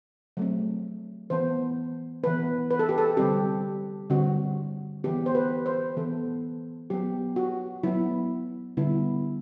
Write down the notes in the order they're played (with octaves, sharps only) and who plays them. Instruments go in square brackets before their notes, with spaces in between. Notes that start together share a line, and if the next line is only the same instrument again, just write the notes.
[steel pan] F#3 A3 C4
E3 B3 C5
E3 B3 B4
B4
A4
G4
A4
D3 G3 C4 G4
D3 G3 C4 F#4
E3 B3 G4
C5
B4
C5
E3 B3 A4
F#3 B3 G4
F#4
F#3 B3 E4
D3 G3 B3 E4